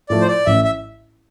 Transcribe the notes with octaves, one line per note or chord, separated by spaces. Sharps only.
A2 F3 A3 D5
C5
D5
A1 E5
E5